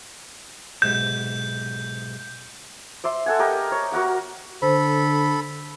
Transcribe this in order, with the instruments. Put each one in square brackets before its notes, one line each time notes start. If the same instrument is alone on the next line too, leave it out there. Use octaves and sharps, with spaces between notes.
[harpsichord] B1 G#2 C3 [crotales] G6
[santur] D5 E5 C6
A4 F#5 G#5
G4 A#4 D#5
C#5
F#4 A#4 F#5 D6
[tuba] D3 [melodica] A4 B5 [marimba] C5